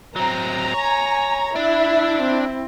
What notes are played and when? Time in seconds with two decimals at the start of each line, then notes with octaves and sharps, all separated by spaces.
0.16 F#3 C4 A#5
0.74 C#5 G#5
1.56 D4 E4 E5
2.21 C4